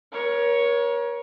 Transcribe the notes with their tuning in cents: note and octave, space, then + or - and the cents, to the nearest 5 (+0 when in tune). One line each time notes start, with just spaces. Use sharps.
A#4 +35 C#5 +5